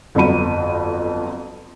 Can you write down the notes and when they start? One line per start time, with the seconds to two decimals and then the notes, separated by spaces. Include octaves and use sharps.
0.15 G1 F2 F#3 B5 D#7